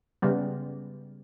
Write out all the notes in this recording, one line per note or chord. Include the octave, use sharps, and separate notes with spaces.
C#3 G3 B3